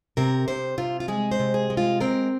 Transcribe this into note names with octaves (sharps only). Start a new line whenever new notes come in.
C3 A#4
C3 C5
C3 F4
F4
G#3 G#4
C5
C3
G#4
G#3
F4
C4 A#4